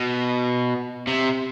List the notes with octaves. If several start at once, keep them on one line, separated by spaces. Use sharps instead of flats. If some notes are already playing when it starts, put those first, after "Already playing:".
Already playing: B2
C3